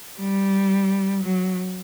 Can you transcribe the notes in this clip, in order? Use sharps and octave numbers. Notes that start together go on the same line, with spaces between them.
G3
F#3